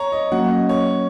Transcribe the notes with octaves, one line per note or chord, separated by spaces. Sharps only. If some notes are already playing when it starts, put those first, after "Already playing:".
Already playing: C#5 A#5
D#5
F#3 A#3 C#4 F#5
D#5
C#5